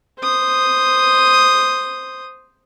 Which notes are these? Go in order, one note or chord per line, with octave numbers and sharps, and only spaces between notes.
C5 D#6